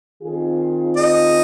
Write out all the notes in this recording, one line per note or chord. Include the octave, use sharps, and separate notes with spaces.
D#3 C4 F4 G#4
D#5